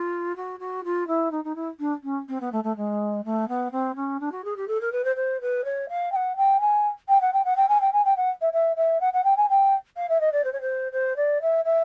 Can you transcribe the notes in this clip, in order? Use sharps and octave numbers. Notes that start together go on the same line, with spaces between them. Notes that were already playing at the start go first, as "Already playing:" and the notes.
Already playing: F4
F#4
F#4
F4
E4
D#4
D#4
E4
D4
C#4
C4
B3
A3
A3
G#3
A3
B3
C4
C#4
D4
F#4
G#4
G4
A4
A#4
B4
C5
C5
B4
C#5
F5
G5
F#5
G5
G#5
G5
F#5
G5
F#5
G5
G#5
G5
G#5
G5
F#5
E5
E5
E5
F#5
F#5
G5
G#5
G5
F5
E5
D#5
D5
C5
C#5
C5
C5
D5
E5
E5